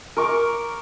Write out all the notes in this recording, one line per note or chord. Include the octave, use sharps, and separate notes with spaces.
A#4 C#6 D6